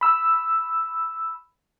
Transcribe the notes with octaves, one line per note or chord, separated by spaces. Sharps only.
B5 E6